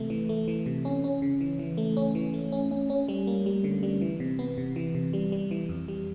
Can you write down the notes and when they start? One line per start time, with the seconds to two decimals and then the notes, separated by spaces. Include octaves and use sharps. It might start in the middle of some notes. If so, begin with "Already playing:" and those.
Already playing: C3 E3 A3
0.10 E3
0.29 A3
0.48 E3
0.66 C3
0.85 C#4
1.04 C#4
1.22 C#3
1.41 E3
1.59 E3
1.77 A3
1.97 C#4
2.15 E3
2.34 A3
2.52 C#4
2.71 C#4
2.90 C#4
3.08 G3
3.27 A#3
3.46 G3
3.64 D3
3.83 G3
4.01 E3
4.20 C3
4.39 B3
4.58 C3
4.76 E3
4.95 C3
5.13 G3
5.32 G3
5.51 E3
5.69 F2
5.88 G3